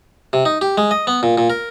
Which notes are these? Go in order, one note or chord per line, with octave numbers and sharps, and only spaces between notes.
C3
D#4
G4
G#3
D#5
B3
A#2
A#2
A#4